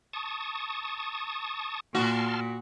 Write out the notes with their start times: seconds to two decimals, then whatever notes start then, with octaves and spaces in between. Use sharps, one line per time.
0.13 A5 C#6 D#6
1.95 A#2 F#4 A5 C6 F6